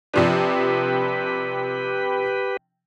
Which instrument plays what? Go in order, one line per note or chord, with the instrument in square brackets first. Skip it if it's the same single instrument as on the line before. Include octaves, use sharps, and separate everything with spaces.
[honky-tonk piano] C3 F3 D4 [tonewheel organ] G4 B4